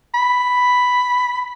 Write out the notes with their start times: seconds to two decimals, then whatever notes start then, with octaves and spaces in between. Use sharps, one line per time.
0.14 B5